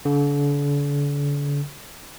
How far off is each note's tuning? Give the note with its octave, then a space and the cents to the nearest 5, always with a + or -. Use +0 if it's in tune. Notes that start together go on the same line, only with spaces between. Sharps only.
D3 -40